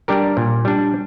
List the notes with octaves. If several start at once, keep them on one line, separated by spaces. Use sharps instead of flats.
G3 D4 G4 A#4
A#2
G3 D4